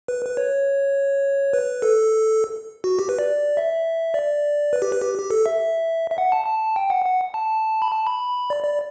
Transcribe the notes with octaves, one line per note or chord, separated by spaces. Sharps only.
B4
B4
C#5
B4
A4
F#4
G4
B4
D5
E5
D5
B4
G4
B4
G4
G4
A4
E5
E5
F#5
A5
A5
G5
F#5
F#5
A5
B5
A5
B5
D5
D5